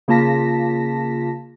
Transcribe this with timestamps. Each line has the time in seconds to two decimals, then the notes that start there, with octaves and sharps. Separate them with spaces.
0.08 C#3 A#3 F4 A5 A#6 B6